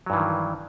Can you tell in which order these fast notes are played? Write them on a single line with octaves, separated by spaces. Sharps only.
F#3 G2 E3 D#3